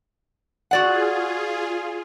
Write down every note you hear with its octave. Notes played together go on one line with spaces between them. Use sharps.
F4 F#4 G#4 D5 F#5